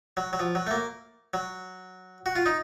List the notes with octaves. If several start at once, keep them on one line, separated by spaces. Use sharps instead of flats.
F#3
F#3
F3
F#3
A3
A#3
F#3
F#4
F4
D#4